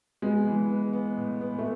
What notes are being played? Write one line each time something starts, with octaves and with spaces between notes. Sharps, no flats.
G#3 B3
E3
B3
B3
A2
B3
A3